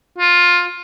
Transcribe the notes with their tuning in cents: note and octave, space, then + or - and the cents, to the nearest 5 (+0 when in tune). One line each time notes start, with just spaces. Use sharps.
F4 +15